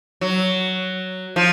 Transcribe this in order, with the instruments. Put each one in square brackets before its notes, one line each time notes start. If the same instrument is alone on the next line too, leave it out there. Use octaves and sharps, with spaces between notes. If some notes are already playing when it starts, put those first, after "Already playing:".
[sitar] F#3
F3